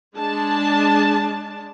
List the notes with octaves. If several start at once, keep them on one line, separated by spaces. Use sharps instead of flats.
G#3 D4 A5